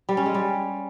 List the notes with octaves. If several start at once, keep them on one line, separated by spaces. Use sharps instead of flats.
G3
C#4
G#3
G3